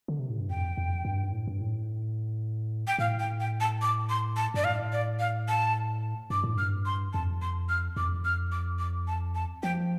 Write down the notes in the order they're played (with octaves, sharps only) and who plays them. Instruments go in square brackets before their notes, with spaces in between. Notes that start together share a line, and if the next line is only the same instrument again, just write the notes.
[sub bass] D3
C3
A2
G2
[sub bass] F2 [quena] G5
[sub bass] F2
G2
A2
G2
A2
[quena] G5
[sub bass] A2 [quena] F5
[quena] G5
G5
A5
D6
C6
A5
[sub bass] G2 [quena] D5
[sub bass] A2 [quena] F5
[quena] D5
F5
A5
[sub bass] G2 [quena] D6
[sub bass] A2
[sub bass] G2 [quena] F6
[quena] C6
[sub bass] F2 [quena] A5
[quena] C6
F6
[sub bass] F2 [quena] D6
[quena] F6
D6
D6
A5
A5
[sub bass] F3 [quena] G5